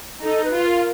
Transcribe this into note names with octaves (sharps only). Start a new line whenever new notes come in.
D#4 A4
B4
F4
A#4